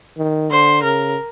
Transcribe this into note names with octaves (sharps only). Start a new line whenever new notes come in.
D#3
D3 C5
C#3 A#4